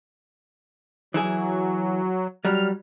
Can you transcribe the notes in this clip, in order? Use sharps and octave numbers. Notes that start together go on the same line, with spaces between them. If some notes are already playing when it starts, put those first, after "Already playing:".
E3 F#3 E4 G#4
F#3 G3 F6